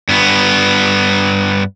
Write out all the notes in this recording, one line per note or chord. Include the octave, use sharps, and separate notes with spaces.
G2 B3